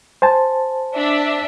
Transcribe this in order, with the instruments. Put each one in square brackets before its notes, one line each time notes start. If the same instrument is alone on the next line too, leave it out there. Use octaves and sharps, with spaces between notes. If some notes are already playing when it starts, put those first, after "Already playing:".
[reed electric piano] C5 G#5 A5
[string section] D4 E5